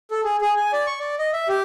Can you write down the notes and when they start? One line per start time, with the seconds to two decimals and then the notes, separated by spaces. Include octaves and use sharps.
0.11 A4
0.24 G#4
0.41 G#4
0.57 G#5
0.73 D5
0.87 C#6
1.00 D5
1.19 D#5
1.33 E5
1.48 G4